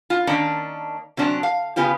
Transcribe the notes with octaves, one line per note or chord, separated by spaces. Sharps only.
F4
D#3 A#3 C#4 D4
C3 F#3 C#4 D4
F5
C#3 B3 C#4 F4 G4